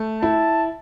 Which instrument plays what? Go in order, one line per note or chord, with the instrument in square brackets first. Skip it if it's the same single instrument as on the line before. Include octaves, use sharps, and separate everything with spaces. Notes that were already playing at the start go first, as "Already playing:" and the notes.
Already playing: [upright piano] A3
[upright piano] E4 [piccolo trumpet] A5